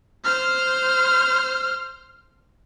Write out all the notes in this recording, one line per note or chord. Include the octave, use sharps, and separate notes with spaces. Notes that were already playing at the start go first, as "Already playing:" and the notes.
C5 F6